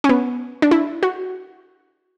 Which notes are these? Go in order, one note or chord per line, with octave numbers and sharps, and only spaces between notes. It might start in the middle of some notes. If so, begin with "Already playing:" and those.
C#4
B3
D4
E4
F#4